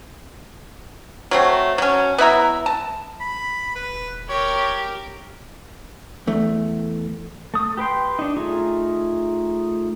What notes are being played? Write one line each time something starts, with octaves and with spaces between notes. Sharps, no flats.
F#3 A3 C4
F#3 C#4
B3 E4 E5 A#5
A5
B5
D#1 B4
G4 A#4 C#5
E2 A3
A3 D#6
G4 B4 G5 C6
D4 D#4
A3 D#4 F4 G#4